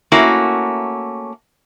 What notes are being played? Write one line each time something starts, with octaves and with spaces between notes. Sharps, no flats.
A3 A#3 C#4 E4 F#4